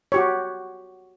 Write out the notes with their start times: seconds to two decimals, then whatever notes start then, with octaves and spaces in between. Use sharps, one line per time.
0.12 F#4 G4 C#5